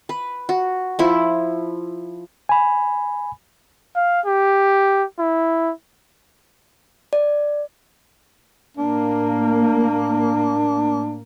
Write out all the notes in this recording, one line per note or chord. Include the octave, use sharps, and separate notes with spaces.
B4
F#4
F3 E4
G#5 B5
F5
G4
E4
D5
A2 A#3 D4